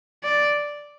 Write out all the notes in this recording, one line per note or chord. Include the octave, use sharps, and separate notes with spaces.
D5